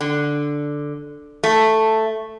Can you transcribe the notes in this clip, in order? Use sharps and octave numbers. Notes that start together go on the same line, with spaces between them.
D3
A3